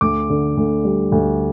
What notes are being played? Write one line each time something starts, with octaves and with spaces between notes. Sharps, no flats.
D2 D6
D3
D2
G3
D2